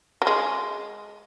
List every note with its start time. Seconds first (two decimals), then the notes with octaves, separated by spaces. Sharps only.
0.22 F#3
0.27 G#3